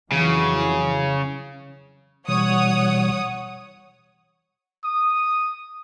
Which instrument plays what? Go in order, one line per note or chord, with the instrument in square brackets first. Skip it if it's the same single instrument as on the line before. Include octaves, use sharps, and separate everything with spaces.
[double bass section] F2 E3 F#3 [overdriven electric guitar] C#3
[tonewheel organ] B2 E3 G3 [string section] C#5 F#5 D#6
[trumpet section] D#6